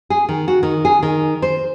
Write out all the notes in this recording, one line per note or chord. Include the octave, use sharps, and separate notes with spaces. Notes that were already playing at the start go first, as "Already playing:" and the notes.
G#4
D#3
F#4
D#3
G#4
D#3
C5